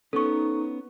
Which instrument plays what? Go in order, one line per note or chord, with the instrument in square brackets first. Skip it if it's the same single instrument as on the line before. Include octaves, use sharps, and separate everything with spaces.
[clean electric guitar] B3 C#4 [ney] D#4 [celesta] A4 C#6